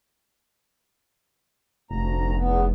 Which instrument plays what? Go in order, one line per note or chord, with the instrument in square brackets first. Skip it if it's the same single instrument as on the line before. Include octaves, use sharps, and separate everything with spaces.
[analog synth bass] F1 [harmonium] D2 A#5
[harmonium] E2 B3